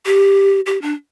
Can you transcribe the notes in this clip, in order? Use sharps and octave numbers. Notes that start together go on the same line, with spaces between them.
G4
G4
D4